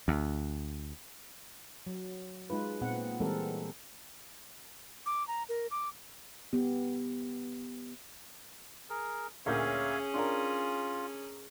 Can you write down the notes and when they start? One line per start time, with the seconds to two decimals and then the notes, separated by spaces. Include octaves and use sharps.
0.08 D2
1.86 F#3
2.50 G#3 D#4 F4 B4
2.81 A#2 B3 C4 F#5
3.20 E3 G3 G#3 C4 A4 A#4
5.06 D6
5.28 A#5
5.49 A#4
5.71 D6
6.53 B3 G4
8.90 G#4 A#4
9.46 D2 A#2 C#4 G#4 C#5 E5 F5 G6
10.14 D4 F4 A#4